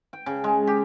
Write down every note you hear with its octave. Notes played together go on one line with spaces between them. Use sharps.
G5
C#3
G#3
G4